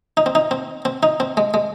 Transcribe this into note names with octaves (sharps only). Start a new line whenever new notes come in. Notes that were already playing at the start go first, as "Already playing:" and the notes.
D#4
C4
D#4
C4
C4
D#4
C4
G#3
G#3